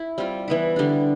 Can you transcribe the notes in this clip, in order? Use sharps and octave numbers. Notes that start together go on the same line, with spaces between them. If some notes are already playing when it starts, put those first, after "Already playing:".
Already playing: E4
G3 C4 F4
E3 B3 E4
D3 G3 D4